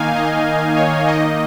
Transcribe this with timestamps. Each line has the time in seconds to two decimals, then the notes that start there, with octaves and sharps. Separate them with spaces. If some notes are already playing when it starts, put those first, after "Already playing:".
Already playing: D#3 A#3 D#4 F5 G#5
0.15 D#5
0.76 C#5
1.07 D#3 A#3 D#4 D#5